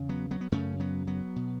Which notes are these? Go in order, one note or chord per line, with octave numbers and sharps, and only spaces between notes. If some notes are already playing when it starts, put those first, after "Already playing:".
Already playing: E2 C#3
F#3 B3
F#3 B3
B3
F#2 C#3 A3 C#4
F#3 B3
F#3 B3
B2